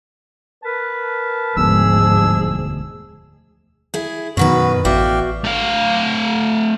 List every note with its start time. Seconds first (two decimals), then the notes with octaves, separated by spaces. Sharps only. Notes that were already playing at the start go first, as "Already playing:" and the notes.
0.62 A#4 B4 A5
1.56 E1 D2 G#2 F3 B3 G#4 E6
3.94 E4 G#4
4.37 F#2 B2 D#3 F#4 B4
4.85 A1 F#4 D5 E5 F5 G5
5.45 A3 F5